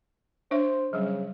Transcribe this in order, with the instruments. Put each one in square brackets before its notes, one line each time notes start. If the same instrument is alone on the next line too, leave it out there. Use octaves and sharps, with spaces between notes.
[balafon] D4 C#5 E5 [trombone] C5
[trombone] C#3 [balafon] F#3 G3